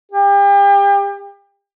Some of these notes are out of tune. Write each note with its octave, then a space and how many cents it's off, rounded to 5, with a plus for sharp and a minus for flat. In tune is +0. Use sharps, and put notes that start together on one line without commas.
G4 +35